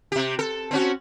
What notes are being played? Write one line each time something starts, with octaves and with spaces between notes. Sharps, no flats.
C3 G4
A4
C4 C#4 F#4